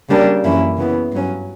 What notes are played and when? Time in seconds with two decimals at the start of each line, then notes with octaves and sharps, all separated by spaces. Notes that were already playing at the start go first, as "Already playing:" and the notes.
0.10 C#3 G3 A#3 D4
0.44 F#2 E3 A#3 C#4 E4
0.78 C#3 E3 B3
1.13 G2 F#3 C#4